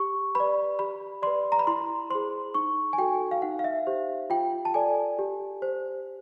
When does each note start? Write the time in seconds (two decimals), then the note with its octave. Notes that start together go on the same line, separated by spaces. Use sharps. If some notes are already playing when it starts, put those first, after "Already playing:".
Already playing: G4 C#6
0.35 B4 D5 B5
0.79 G4 B5
1.22 B4 D5 C6
1.52 A#5
1.59 B5
1.67 E4 C6
2.10 G#4 C5 C6
2.54 D#4 C#6
2.93 G#5
2.98 F#4 A4 G5
3.31 F5
3.42 D#4 F#5
3.59 F5
3.64 E5
3.87 G4 C5
4.30 F4 G5
4.65 A5
4.74 A4 D5 G#5
5.19 G4
5.62 C5